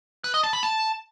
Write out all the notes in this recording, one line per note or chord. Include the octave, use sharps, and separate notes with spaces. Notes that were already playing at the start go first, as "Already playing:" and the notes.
B4
D#5
A5
B5
A5